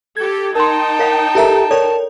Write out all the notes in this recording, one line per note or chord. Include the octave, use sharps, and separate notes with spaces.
G4 A4 G#6
D#4 A#4 G5 A5 C6
A#4 C#5 F5 F#5
E4 G4 A4 A#4 E5 A#5
A4 A#4 C#5 D5